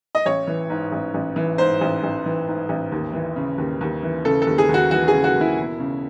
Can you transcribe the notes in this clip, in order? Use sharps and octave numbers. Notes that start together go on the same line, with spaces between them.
D#5
A1 C#5
E3
G#2
A1
A1
E3
G#2 C5
A1
A1
E3
G#2
A1
D#2
E3
C#3
D#2
D#2
E3
C#3 A4
A4
D#2
G#4
D#2
F#4
E3 F#4
G#4
C#3
F#4
D#2 E4
E1
C#3